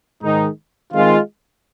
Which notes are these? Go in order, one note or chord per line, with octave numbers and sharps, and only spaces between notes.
G#2 D#3 G#3 D#4
D#3 G#3 C4 F4